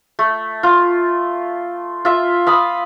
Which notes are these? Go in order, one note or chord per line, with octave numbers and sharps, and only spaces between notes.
A3
F4
F4 E5
F5 B5 D#6